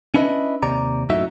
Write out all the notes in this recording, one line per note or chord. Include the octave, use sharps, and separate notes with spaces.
C#4 D4 E4 B4 D#5
D#2 C3 D5 A#5
F#2 A2 D#4 F#4 E5